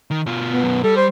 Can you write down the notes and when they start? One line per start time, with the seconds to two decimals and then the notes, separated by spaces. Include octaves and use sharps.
0.11 D#3
0.27 B2 F4
0.50 B3
0.63 F#2 B2
0.84 G3 A4
0.96 C5